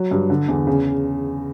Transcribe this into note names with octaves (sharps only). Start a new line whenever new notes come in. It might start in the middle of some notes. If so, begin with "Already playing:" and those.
Already playing: F#3
G2
D3
E2
C#3